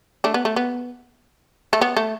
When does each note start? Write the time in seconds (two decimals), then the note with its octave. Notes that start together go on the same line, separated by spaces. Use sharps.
0.24 A3 D4
0.34 B3
0.45 A3
0.56 B3
1.73 A3
1.81 B3
1.97 A3